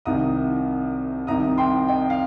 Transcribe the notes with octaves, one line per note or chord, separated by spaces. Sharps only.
C2 C3 D#3 A#5 D#6
C2 C3 D#3 A#5 D#6
G5 C6
D#5 G5
F5